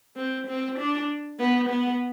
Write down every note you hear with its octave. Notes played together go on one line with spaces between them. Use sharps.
C4
C4
D4
B3
B3